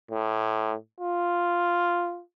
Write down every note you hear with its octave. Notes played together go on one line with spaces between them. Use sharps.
A2
F4